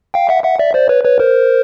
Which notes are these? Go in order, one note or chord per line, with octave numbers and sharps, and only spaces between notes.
F5 G5
E5 F#5
E5 F#5
D5 E5
C5 D5
B4 C#5
B4 C#5
A#4 C5